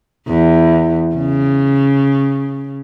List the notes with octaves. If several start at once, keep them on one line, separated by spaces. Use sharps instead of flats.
E2
C#3